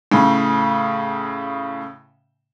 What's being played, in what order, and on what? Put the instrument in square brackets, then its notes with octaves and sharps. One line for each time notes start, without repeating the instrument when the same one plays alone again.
[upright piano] A2 C#3